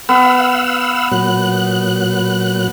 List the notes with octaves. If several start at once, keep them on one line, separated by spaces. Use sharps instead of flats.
B3 F5 F#5 E6
A#2 F#3 F#6